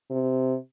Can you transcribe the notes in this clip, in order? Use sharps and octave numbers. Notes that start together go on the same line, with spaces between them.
C3